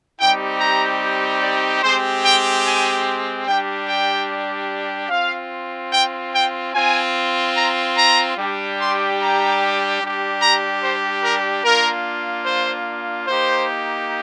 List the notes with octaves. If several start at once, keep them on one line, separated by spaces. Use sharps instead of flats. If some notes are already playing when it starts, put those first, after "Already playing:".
G3 C4 D#4 G4 G5
A#5
D5
G#3 C4 G4 C5
G5
G#5
G3 D4 G4 G5
G5
C4 F4 F5
G5
G5
C4 F4 G#5
A#5
A#5
G3 D4 G4
C6
A#5
G3 D4 G4
A#5
C5
A#4
A#3 D4 F4 A#4
C5
A#3 D#4 G4 C5